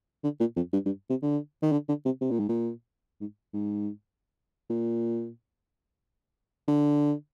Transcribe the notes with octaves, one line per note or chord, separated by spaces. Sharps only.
D3
A#2
F2
G2
G2
C3
D3
D#3
D3
D3
C3
C3
A#2
G#2
A#2
G#2
G#2
A#2
D3